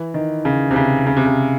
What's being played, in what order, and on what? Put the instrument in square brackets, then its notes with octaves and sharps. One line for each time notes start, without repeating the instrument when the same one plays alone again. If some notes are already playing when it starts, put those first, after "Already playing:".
Already playing: [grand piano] E3
D#3
C#3
C3
C#3
C#3
C3
C#3